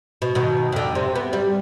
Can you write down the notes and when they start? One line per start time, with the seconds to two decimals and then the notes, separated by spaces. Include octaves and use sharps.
0.22 B2
0.35 B2 D#3
0.72 F2 D3
0.95 C3
1.15 B3
1.33 G3